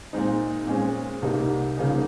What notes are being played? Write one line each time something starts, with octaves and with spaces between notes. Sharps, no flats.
A#2 G#3 C4 D#4
A#2 G#3 C#4 G#4 C5
C2 C3 G3 A#3 D#4
C#3 F3 A#3 D#4 G#4